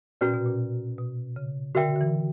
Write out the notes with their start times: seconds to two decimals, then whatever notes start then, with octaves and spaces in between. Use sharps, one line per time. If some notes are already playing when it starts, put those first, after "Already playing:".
0.21 A#2 C#4 F#4 B4 D5 A#5
0.34 B2
0.46 A#2
0.98 B2
1.36 C#3
1.75 D3 F#4 A#4 E5 G5
1.96 D3
2.01 E3